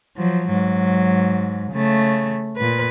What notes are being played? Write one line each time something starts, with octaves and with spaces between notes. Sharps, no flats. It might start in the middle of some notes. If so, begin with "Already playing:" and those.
F3 F#3
G#2 F#3
C#3 A3
A#2 B4